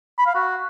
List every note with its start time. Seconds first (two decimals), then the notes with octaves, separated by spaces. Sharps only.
0.18 B5
0.27 F5
0.35 F#4